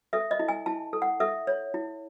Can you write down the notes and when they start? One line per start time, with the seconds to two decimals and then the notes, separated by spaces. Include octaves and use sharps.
0.13 A4 E5
0.31 D#5
0.39 E4
0.48 G#5
0.66 E4 A5
0.93 A4
1.02 F#5
1.20 A4 E5
1.47 C#5
1.74 E4